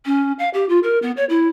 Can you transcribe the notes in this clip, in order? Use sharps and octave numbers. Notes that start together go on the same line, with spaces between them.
C#4
F5
G4
F4
A#4
B3
C#5
E4